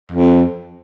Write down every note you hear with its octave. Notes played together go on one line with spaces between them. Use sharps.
F2